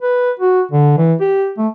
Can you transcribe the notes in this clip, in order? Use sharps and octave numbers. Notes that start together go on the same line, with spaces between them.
B4
F#4
D3
E3
G4
A3